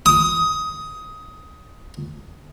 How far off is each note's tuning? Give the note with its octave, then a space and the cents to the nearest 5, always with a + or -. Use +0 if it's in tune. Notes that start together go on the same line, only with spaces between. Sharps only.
D#6 +15